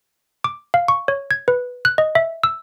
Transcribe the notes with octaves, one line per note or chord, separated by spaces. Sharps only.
D6
F5
C#6
C#5
G#6
B4
F#6
D#5
E5
E6